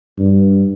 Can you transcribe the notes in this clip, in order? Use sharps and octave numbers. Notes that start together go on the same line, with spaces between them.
G2